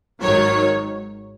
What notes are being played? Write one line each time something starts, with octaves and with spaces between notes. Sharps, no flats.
G#1 G#2 D#3 F#3 C#5